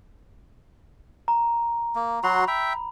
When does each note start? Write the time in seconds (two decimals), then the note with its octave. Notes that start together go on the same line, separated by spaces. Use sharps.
1.28 A#5
1.95 A#3
2.24 F#3 F#4 B5 C6
2.48 E5 G5 B5